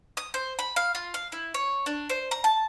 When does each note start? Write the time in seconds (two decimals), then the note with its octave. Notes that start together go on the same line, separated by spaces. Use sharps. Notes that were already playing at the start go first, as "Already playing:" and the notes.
0.17 D#6
0.34 C5
0.59 B5
0.76 F5
0.95 F4
1.14 F5
1.32 E4
1.54 C#5
1.86 D4
2.09 C5
2.31 A#5
2.44 A5